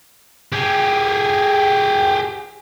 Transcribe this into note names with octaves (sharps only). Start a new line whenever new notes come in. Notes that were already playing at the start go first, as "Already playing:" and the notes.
G4 G#4